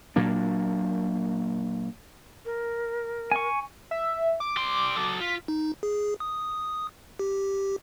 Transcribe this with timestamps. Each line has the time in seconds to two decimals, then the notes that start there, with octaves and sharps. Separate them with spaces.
0.16 A#2 F#3 A#3 D4
2.45 A#4
3.32 G#5 C#6
3.91 E5
4.40 D6
4.57 G3 C6
4.97 F#3 A4
5.20 F4 B6
5.48 D#4
5.83 G#4
6.20 D#6
7.19 G4